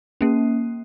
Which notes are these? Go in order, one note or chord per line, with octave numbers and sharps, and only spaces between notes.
A#3 C#4